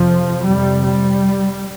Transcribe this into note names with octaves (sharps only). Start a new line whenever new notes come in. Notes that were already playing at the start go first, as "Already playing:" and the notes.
Already playing: F2 C3 F3
F2 C3 G3
G3